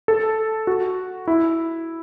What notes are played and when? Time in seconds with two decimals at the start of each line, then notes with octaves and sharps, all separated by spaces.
0.08 A4
0.67 F#4
1.28 E4